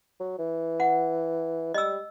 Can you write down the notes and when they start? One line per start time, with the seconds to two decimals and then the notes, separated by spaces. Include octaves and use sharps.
0.20 F#3
0.38 E3
0.80 F#5
1.74 G3 D#5 E6